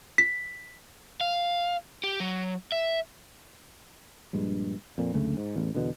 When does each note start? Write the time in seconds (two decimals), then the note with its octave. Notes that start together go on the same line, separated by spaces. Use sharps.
0.18 B6
1.21 F5
2.04 G4
2.20 F#3
2.72 E5
4.33 A#1 G2 G#3
4.98 F2 A#2
5.14 F#1 D2 C#3 A3
5.37 G#2
5.56 A1 E2
5.75 E2 B2 D3